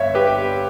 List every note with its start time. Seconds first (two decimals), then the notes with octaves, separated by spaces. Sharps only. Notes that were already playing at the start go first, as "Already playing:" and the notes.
Already playing: G1 G2 C#5 E5
0.10 G1 G4 B4